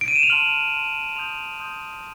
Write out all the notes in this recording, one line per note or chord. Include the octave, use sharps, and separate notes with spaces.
D7
D#7
E7
F7
A5 C6 F6 F#7
A5 C6 F6
C6 D#6 G6 F7
C6 D#6 G6